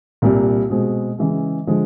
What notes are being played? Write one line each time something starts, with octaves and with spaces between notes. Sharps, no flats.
C2 A#2 G3
B2 G#3 C4
C#3 E3 G#3
D3 F3 G#3